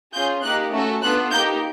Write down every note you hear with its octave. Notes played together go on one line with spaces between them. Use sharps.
C#4 F4 G#4 G6
A#3 D#4 G4 F#6
A3 C#4 F#4 A4
B3 D4 F4 A4 F#6
A#3 D#4 G4 G6